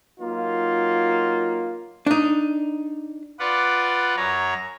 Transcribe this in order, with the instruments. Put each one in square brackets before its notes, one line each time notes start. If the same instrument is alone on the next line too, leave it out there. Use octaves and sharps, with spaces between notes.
[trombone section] F#3 A#3 D#4 F4
[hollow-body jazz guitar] D4 D#4
[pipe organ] F4 B4 D5 F#5
F#2 C#5 A#5